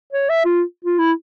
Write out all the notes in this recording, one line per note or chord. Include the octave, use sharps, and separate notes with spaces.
C#5
E5
F4
F4
E4